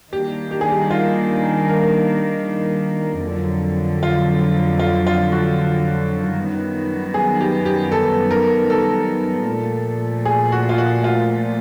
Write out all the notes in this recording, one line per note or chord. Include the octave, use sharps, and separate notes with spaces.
D#3 G3 A#3 D4 G4
G4
G#4
G4
F4
A#4
F2 D3 F#3
F4
F4
F4
F#4
F#2 D#3 G3 B3
G#4
G4
G4
A4
A#4
A4
A#2 F3 A3
G#4
F#4
F4
F#4
F4